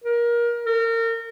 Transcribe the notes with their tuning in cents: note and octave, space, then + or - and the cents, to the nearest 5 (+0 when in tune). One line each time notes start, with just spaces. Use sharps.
A#4 +25
A#4 -30